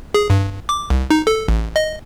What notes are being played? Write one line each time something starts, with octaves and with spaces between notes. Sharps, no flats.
G#4
G2
D6
C2
D#4
A4
A1
D#5